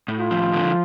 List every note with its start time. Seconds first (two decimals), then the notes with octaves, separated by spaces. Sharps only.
0.08 A2
0.19 F4
0.31 F3
0.54 D3